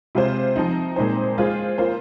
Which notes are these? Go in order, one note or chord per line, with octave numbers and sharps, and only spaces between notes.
C3 G#3 F4 C5
F3 C4 D#4
A#2 G#3 C4 D#4 C5
G#3 F4 G#4 C5
A#3 F4 C5